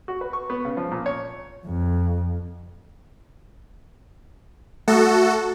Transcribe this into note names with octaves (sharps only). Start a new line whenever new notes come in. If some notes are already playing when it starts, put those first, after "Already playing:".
F#4
B4
C#6
B3
C#3
F3
A#2
C#5
F2
A3 F#4 A4